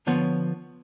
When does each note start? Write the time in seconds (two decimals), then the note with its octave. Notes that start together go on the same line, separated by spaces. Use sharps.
0.07 D3 F3 B3 C#5